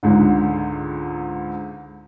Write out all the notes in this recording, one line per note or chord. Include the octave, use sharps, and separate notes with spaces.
C#2 G#2 D3